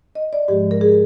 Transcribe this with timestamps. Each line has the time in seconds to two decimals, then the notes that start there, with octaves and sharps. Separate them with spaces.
0.15 D#5
0.33 D5
0.48 G#2 F3 G#3 G4
0.71 A#4
0.81 G#4